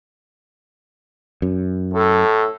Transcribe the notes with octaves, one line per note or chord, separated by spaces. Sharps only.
F#2
A2 A4